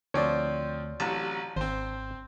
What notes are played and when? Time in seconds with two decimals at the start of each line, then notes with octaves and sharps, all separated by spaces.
0.14 D2 F3 C4 C#5 D5
1.00 A1 C3 F#3 A5
1.56 G#1 C4 C5